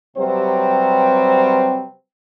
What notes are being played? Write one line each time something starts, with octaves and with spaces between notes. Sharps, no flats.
C3 F#3 G3 C4 B4 C5